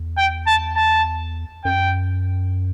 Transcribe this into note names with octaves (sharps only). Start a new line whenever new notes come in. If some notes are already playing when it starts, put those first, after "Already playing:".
Already playing: E2
G5
A5
A5
F#2 G5